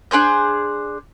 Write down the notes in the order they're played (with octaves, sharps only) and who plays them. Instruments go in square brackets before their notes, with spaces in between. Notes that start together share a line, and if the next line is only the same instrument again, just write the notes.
[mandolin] D4 G#4 C5 G6